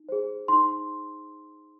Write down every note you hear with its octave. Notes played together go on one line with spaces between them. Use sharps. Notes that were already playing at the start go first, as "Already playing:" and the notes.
Already playing: D#4
G#4 C5
D#4 C6